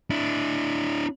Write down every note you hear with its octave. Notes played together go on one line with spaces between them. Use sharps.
D4 E4